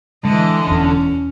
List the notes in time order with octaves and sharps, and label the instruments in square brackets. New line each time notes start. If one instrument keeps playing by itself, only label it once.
[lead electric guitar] D3 [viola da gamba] E3 D#5 [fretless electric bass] G#3
[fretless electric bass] E1 E2 [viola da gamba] C#4